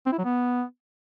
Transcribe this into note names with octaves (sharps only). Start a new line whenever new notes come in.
C4
E4
F#3
B3